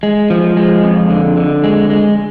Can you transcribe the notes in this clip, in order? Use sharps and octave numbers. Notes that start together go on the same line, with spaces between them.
G#3
F3
G#3
F2
D3
D3
G#3
G#3